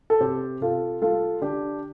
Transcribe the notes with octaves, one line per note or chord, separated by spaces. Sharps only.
A4
C3 G4 C5
C3 F4 A4
G3 F4 A4
D3 D4 G4